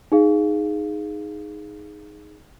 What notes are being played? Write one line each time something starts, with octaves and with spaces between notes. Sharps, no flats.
D#4 G#4 F5